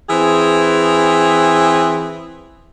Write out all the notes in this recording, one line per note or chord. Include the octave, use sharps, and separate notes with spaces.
E3 C4 G#4